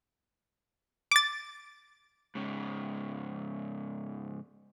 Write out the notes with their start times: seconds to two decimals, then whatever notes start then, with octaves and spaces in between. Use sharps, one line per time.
1.11 D6 A6
2.35 G#2 C#3